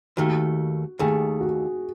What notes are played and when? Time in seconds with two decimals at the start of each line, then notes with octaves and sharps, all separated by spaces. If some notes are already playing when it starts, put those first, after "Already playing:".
0.17 D#2 D#3 A3 F#4
0.99 D#2 D#3 A3 G#4
1.40 F#4